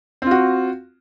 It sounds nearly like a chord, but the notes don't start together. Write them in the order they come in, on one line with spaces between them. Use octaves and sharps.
C4 F4 F#4